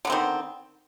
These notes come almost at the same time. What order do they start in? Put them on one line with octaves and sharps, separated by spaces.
D3 B3 C4 D#3